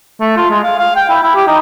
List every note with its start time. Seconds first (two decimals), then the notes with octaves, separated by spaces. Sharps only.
0.20 A3
0.37 F4
0.50 G#3
0.63 F5
0.79 F5
0.96 G5
1.09 E4
1.23 E4
1.35 G4
1.47 D#4